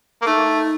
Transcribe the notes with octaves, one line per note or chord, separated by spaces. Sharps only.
A#3
A3 D#4